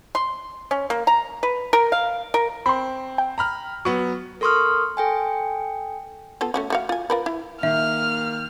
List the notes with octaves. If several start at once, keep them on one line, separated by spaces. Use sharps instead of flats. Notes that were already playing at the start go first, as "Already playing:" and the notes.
C6
C#4
A#3
A#5
B4
A#4
F5
A#4
C4 B5 C6
G5
A#5 B5 F6
F#3 B3 C#6
A4 A#4 C6 C#6 D#6 F6
A4 G5 G#5
B3 F4 A4
A3 C#4 F#4
A3 F#4 F5
F4 G#5
F4 A#4 B4
E4
D#3 A#3 E5 F6